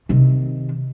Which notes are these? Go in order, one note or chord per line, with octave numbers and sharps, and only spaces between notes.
C3 D#3